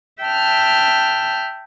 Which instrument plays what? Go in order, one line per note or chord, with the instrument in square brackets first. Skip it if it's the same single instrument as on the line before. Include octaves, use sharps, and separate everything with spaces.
[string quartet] E5 G5 A5 F6